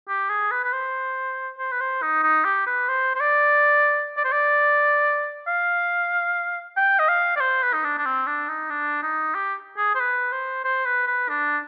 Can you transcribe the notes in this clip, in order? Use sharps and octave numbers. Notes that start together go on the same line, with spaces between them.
G4
G#4
B4
B4
C5
C5
B4
C5
D#4
D#4
G4
B4
C5
C5
D5
D5
C5
D5
F5
G5
D#5
F5
D5
C5
B4
D#4
D4
D4
C4
D4
D#4
D4
D#4
G4
G#4
C5
B4
C5
C5
B4
B4
D4